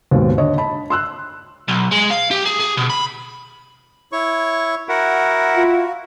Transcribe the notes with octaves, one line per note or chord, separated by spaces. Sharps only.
D#2 G#2 B2
D3 C#5 D#5
A5 B5
C6 E6 F#6
B1
G#3
F5
G4
G#4
G#4
B2
B5
E4 C#5 C#6
E4 F#4 A#4 F#5
F4